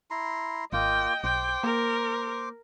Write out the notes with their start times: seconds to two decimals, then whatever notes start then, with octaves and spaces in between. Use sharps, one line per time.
0.11 E4 A#5 C6
0.73 G#1 A#3 F4 D#5 G5
1.24 B1 C5 G5 D6
1.64 A#3 A#4